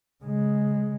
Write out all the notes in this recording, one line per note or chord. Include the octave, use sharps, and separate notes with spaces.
C#3 G#3